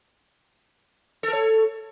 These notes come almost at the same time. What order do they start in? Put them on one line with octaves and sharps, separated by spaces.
A4 A#4 C#5